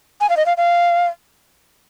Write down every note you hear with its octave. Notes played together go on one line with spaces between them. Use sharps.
G#5
F5
D#5
F5
F5